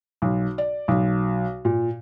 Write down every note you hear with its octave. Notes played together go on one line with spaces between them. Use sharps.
B1
D5
B1
A#2